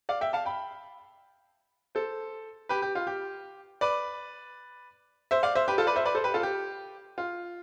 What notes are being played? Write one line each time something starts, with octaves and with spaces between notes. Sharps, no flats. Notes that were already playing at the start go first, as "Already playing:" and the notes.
D5 F5
E5 G5
F5 A5
G5 B5
A4 C5
G4 B4
G4
F4
G4
B4 D5
C5 E5
D5 F5
C5 E5
G4 B4
F4 A4
B4 D5
C5 E5
B4 D5
A4 C5
G4 B4
F4 A4
G4
F4